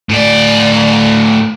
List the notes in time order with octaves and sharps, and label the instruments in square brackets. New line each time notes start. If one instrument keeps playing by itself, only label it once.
[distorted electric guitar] A2 D5